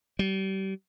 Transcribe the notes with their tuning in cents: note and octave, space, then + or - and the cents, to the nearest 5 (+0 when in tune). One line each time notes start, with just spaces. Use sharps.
G3 -35